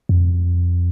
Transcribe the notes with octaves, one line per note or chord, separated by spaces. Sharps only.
F2